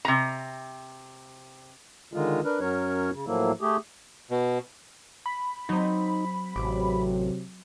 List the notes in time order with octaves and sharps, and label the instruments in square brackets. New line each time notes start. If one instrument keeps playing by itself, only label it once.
[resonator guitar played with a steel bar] C3 A#5
[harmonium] D3 D#3 G#3 F4
D4 A#4 B4
F#2 F#3 C#4 A#4 C#5
C#3
A2 F3 F#3 A#3 E4
A3 G4 G#4
[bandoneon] B2
[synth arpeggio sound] B5
[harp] F#3 C4 [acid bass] D#4
[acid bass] A1 [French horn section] C3 F#3 [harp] D6